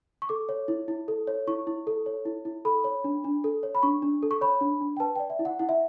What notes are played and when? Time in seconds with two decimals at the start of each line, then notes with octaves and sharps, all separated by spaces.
0.22 C#6
0.29 A4 D6
0.49 C#5
0.68 E4
0.88 E4
1.08 A4
1.27 C#5
1.47 E4 C#6
1.67 E4
1.87 A4
2.06 C#5
2.25 E4
2.45 E4
2.65 A4 B5
2.84 C#5
3.04 D4
3.24 D4
3.44 A4
3.63 C#5
3.75 B5
3.83 D4 C#6
4.02 D4
4.23 A4
4.31 C#6
4.41 C#5 B5
4.61 D4
4.81 D4
4.97 G5
5.00 B4 A5
5.16 D5 G5
5.30 E5
5.39 E4
5.45 F#5
5.59 E4 F#5
5.69 E5